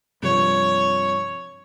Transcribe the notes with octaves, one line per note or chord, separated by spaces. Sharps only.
G2 C3 F3 C#5